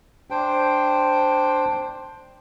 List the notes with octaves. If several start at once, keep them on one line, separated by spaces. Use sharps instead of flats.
D4 C5 G5